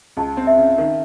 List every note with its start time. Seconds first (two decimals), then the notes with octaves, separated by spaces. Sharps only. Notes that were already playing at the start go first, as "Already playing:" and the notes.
0.17 C#2 A5
0.37 C4
0.47 E5
0.58 C#3
0.78 D#3